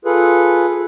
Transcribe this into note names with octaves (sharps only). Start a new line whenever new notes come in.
F4 G#4 A4 B4